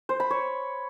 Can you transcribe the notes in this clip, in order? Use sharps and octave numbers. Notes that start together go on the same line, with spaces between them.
C5
B5
C#5